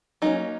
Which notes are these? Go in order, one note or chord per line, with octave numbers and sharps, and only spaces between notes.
F#3 A#3 C#4 D#4